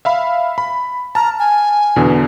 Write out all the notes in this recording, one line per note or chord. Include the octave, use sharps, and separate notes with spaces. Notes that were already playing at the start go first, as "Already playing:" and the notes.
E5 F5 B5
B5
A5 A#5 F6
G#5
E2 B2 D3